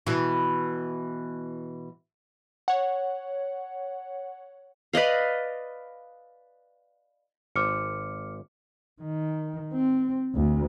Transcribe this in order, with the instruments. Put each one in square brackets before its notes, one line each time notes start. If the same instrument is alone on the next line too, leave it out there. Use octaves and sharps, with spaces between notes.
[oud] B2 E3
[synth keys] C#5 F#5
[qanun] B4 D5 D#5 F5
[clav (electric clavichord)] G#1 C5 [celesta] D6 F6 C#7
[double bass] D#3
C4
D2